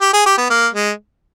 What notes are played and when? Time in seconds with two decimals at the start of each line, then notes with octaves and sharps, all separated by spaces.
0.02 G4
0.14 G#4
0.26 G4
0.38 B3
0.50 A#3
0.74 G#3